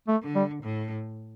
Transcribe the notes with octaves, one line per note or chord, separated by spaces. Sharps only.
A3
D3
G3
A2